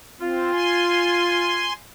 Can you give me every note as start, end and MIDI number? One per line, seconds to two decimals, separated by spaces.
0.20 0.51 60
0.20 1.68 65
0.51 1.73 80
0.51 1.73 84